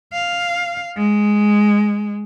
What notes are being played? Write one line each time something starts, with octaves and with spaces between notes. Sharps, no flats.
F5
G#3